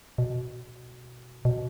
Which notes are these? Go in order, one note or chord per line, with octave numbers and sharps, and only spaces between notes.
B2
B2